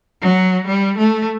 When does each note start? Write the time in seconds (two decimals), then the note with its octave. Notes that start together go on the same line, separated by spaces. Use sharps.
0.22 F#3
0.67 G3
0.98 A3